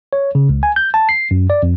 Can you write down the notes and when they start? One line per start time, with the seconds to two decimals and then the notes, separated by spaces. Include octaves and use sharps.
0.13 C#5
0.35 C#3
0.49 C#2
0.63 G#5
0.76 G6
0.94 A5
1.09 C7
1.31 F#2
1.50 D5
1.63 F2